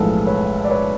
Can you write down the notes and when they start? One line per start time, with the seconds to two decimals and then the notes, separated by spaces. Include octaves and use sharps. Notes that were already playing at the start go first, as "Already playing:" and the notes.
Already playing: B1 A2 F3 G#3 A4 B4
0.26 B4 C#5
0.65 D5
0.70 B4 C#5